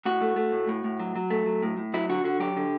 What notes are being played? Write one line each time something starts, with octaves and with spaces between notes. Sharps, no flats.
A2 F#4
A3
A3
A2
A2
A2
F#3
F#3
A3
F#3
A2
A2
F#3 E4
D3 F#4
D3 F#4
F#3 G4
D3